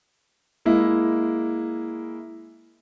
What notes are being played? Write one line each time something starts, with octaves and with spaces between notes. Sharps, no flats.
G#3 A#3 E4